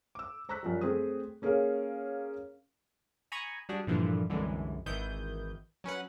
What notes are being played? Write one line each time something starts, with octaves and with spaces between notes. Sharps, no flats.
D6 E6
C5 A#5 C#6 E6 F#6 B6
F#2 F3 G3
A3 C4 G#4 C5 D#6
A#3 C#4 G#4 A#4 C#5 F5
G#5 A#5 B5 C#6 D#6 G#6
G3 D4 F#4 G#4
G2 A#2 D3 E3 F3
C2 F#2 D3 E3 G#3
G#1 D#3 E3 E4 D#6 G6
F#3 C#4 B4 F#5